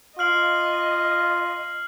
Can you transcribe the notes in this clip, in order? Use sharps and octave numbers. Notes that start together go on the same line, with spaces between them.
F4 D#5 F6 C7 F#7